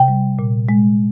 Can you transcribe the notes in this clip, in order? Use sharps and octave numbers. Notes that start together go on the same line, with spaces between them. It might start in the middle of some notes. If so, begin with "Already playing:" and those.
Already playing: C3 G5
G3
A#2
G#3